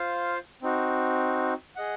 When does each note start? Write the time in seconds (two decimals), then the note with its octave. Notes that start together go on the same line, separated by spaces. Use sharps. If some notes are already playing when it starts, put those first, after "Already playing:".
Already playing: F4 C5 F5
0.62 C4 D#4 F#4
1.76 G#4 D#5 F#5